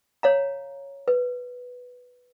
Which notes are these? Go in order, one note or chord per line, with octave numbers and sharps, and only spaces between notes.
C#5 F5 A#5
B4